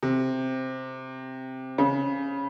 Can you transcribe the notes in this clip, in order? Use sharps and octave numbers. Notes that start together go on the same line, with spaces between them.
C3
C#3